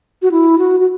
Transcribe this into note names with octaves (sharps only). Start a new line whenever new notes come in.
F#4
E4
F#4
F#4